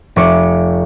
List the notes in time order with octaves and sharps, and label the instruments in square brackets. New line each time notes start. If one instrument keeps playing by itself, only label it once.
[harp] F1 C#6 D6 C#7